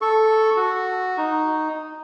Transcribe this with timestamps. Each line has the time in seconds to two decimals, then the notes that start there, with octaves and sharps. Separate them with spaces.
0.01 A4 C#6
0.56 F#4
1.18 D#4